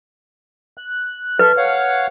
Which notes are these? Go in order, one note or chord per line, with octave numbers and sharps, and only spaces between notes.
F#6
A4 B4 E5
C#5 F5 F#5